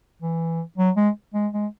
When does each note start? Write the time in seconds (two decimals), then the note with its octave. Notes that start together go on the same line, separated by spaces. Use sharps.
0.22 E3
0.78 F#3
0.96 G#3
1.34 G#3
1.53 G#3